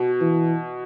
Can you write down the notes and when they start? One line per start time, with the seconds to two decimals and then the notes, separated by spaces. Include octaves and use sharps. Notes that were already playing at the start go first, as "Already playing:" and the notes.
Already playing: B2
0.21 E3